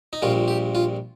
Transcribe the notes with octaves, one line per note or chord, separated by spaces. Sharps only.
D#4
A#1 A#2 G3 F4
G4
F4